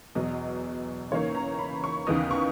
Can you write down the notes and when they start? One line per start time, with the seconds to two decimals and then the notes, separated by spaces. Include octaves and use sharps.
0.15 E2 B2 F#3 B3 D#5
1.11 C#3 E3 A#3 D#4 C#5
1.35 A#5
1.59 B5
1.84 C#6
2.07 D#2 C#3 E3 B3 D#4 D#6
2.31 C#6